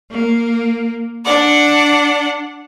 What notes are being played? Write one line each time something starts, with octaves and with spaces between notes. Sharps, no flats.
A#3
D4 D5 F#5